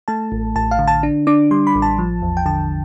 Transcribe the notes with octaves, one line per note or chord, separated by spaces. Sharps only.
A3 A5
A1
A1 A5
F5
D3
A5
D4
D4 D6
G3 C6
B5
A1
A5
F3
E2
G5
D3 A5